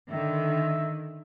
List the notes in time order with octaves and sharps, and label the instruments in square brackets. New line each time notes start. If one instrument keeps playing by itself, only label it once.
[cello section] D3 D#3 [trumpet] E5